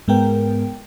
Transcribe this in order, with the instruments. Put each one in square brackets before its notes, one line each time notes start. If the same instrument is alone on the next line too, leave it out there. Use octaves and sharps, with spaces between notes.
[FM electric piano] G#2 G#3 B3 A#4 G5